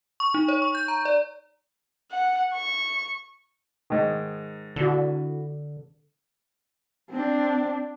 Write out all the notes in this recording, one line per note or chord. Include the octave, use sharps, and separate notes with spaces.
C#6
D#4
C#5
C#6
G6
A#5
D5
F#5
C#6
G#2 D#3
D3 E4 F#4
C4 D4